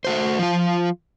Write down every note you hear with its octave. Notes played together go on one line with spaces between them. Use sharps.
A3 F#4 C5
F3 F4